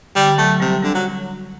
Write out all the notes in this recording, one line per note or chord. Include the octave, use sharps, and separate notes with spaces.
D3 G3
F#3 A3
C3 G3
D3 G3
F#3